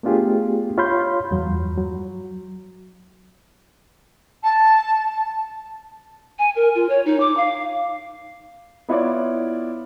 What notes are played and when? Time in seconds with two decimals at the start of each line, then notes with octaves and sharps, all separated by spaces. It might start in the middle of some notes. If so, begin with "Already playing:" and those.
0.03 A3 B3 D4 F4 G4 G#4
0.78 F4 C#5 F5 B5 C6 G6
1.31 E2 G2 F#3
1.77 F#3
4.44 A5
6.39 G#5
6.56 A#4
6.75 F4
6.89 C#5
7.06 D#4
7.20 D6
7.37 F5
8.88 B3 E4 F4 C#5 D5